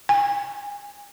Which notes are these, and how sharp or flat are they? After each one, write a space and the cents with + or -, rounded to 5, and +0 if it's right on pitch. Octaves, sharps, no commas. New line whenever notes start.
G#5 -40